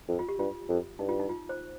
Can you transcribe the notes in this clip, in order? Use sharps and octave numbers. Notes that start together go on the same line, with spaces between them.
F2
F4
G4
G2 F4
F2
G2 D#4
F4
D#4
F4
C5